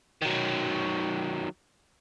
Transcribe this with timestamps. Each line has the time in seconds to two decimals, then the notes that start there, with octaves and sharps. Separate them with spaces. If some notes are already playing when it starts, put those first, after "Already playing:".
0.22 D#3 F#3